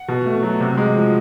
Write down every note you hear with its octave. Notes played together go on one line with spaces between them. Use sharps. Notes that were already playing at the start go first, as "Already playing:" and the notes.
Already playing: F#5
B2
A3
F#3
C3
G#3
F3